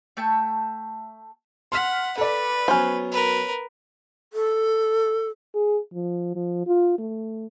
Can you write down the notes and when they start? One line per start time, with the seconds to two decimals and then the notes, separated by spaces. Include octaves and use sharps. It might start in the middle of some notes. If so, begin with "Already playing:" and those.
0.17 A3 G5 A5
1.72 F#5 C6 F6 B6
2.18 A4 B4 D5
2.68 F#3 B3 C#4 C5
3.11 A#4 B4
4.33 A4
5.54 G#4
5.94 F3
6.36 F3
6.67 F4
6.99 A3